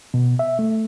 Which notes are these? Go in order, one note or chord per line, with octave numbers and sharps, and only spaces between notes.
B2
E5
A3